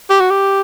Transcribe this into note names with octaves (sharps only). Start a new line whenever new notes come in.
G4
F#4
G4